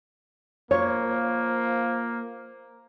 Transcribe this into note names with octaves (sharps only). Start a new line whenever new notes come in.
F3 A#3 C#5